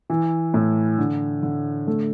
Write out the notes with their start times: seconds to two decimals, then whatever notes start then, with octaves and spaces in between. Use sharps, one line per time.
0.10 E3
0.54 A2
0.98 D3
1.43 D3
1.87 A3